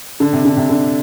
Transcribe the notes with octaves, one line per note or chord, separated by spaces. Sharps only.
D3
C3
D3
C3
D3